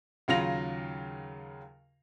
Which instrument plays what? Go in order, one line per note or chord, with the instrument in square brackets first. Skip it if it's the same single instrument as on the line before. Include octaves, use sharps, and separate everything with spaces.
[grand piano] D#2 C#3 F#3 F4 A#6 F7